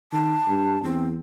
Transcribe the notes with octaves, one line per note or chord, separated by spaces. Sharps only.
D#3 A5
G2
E2 C4